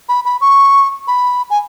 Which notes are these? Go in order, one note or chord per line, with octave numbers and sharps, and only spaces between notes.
B5
B5
C#6
B5
G#5